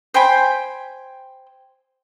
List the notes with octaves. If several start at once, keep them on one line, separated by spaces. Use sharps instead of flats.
C5 G5 G#5 B5